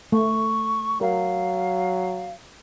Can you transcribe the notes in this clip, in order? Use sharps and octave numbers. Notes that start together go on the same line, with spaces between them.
A3 C#6
F#3 A#4 F5